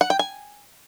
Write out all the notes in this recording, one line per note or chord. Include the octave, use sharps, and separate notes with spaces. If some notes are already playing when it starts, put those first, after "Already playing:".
F#5
G5
G#5